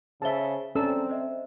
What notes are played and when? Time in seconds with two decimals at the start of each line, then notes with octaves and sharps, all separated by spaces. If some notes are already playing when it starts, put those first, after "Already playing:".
0.22 C#3 G#4 C5 E5 A5 G7
0.75 C4 C#4 A4 D5 A#5 E6
1.09 C5 D#5 E5